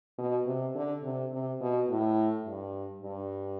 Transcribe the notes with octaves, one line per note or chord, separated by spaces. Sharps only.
B2
C3
D3
C3
C3
B2
A2
G2
G2